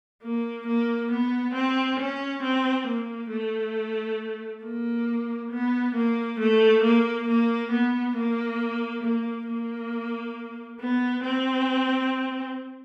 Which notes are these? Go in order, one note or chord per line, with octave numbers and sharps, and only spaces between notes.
A#3
A#3
B3
C4
C#4
C4
A#3
A3
A#3
B3
A#3
A3
A#3
A#3
B3
A#3
A#3
A#3
B3
C4